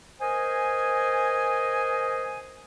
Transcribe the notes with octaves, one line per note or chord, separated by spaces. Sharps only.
A#4 C5 D#5 G#5